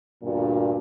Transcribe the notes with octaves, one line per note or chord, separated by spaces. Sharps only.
D2 G2 A#2